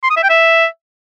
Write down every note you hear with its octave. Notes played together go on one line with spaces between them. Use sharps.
C6
D#6
E5
G5
E5